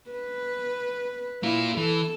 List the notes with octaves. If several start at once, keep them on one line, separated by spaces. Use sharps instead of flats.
B4
A#3 E4 F4
E3 A4